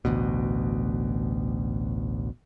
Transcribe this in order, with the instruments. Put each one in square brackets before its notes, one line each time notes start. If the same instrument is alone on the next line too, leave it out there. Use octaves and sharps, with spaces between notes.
[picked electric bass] A1 D2 B2